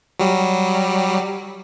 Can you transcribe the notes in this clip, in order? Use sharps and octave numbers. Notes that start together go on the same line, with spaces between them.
F#3 G3